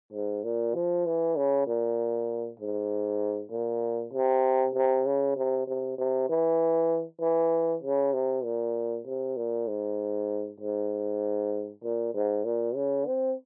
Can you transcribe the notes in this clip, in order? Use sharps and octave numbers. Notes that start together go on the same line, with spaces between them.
G#2
A#2
F3
E3
C#3
A#2
G#2
A#2
C3
C3
C#3
C3
C3
C3
E3
E3
C#3
C3
A#2
C3
A#2
G#2
G#2
A#2
G#2
A#2
C#3
C4